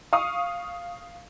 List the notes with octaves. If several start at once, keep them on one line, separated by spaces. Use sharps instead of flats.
F5 C#6 D#6